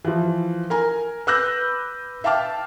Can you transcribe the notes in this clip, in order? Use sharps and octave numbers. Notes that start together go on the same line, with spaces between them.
E3 F3
A#4 G#5 A#5
B4 D6 E6 F#6 G6 A#6
E5 F5 G5 A5 D6 F6